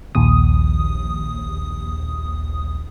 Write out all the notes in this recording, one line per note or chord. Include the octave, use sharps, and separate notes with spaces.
A#1 D#2 D#6